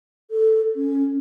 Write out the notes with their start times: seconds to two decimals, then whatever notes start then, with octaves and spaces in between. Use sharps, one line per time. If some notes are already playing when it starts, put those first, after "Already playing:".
0.31 A4
0.76 C#4